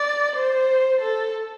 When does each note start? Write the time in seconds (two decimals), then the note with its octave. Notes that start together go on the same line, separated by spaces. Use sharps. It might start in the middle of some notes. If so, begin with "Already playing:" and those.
Already playing: D5
0.36 C5
1.01 A4